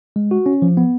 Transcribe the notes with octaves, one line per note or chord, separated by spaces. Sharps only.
G#3
F#4
C#4
F3
B3